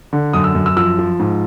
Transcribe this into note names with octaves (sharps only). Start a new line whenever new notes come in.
D3
F#2 D#6
E6
F#2
E6
F3 E6
F3
G#2